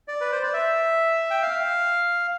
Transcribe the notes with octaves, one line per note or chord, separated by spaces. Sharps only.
D5
B4
C5
D5
E5
G5
F5